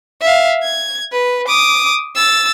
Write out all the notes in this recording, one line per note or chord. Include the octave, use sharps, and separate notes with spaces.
E5 F5
G#6
B4
D6 D#6
E6 A6